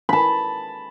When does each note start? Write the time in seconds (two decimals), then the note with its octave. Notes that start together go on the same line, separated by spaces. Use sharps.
0.09 A5 B5